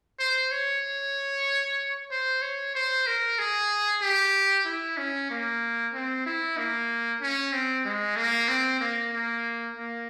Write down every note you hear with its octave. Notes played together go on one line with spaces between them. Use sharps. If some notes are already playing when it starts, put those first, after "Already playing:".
C5
C#5
C5
C#5
C5
A#4
G#4
G4
E4
C#4
A#3
C4
E4
A#3
C#4
C4
G#3
A#3
C4
A#3
A#3
A#3